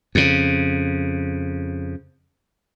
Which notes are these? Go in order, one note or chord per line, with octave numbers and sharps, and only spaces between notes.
F2 C#3